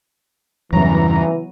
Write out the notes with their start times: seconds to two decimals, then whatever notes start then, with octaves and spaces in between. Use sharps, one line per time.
0.73 E2 G2 C#3 E3 F#3 B3 A#5
1.15 D#7